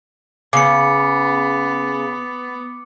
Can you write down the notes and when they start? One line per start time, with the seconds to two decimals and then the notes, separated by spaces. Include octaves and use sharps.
0.53 C#3 B3 D6 C#7